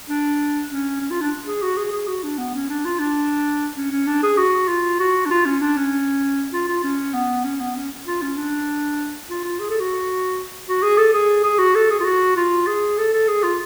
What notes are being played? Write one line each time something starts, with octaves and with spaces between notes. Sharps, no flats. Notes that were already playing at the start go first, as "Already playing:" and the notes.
D4
C#4
C#4
F4
D4
G#4
F#4
G#4
G#4
F#4
D4
B3
C#4
D4
F4
D4
C#4
C#4
D4
G#4
F#4
F4
F#4
D4
F4
C#4
D4
C#4
F4
F4
C#4
B3
C#4
B3
C#4
F4
C#4
D4
F4
F4
G#4
A4
F#4
F#4
G#4
A4
G#4
G#4
F#4
A4
G#4
F4
F#4
F4
G#4
A4
A4
G#4
F4